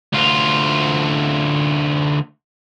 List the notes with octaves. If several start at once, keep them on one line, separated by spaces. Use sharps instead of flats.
D2 F4